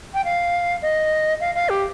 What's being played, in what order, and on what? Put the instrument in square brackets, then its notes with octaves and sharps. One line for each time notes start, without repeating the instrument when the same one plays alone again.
[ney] G5
F5
D#5
F5
F5
G4